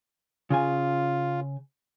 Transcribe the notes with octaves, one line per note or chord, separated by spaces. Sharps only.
C#3 F4 G#5